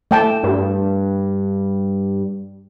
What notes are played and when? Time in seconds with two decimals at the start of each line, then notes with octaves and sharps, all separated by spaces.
0.11 A3 G5 A5
0.43 G2